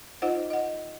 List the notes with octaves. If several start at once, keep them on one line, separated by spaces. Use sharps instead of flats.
D#4 F4 C5 D#5 F#5
D#5 F#5